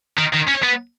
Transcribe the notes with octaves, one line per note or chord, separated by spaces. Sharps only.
D#3
D#3
C#4
B3